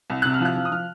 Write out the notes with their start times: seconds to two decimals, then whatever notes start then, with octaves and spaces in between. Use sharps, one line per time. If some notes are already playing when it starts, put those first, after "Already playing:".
0.10 C2
0.22 C3 F#6
0.34 F6
0.40 F3 F#6
0.56 F3
0.65 D#6
0.71 F3 F6